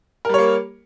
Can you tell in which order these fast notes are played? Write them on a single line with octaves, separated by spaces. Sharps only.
A#4 G3 C#5 A#3